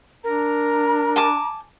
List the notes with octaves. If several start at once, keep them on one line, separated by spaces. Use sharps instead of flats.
D4 A#4 A#5
G#5 A5 D6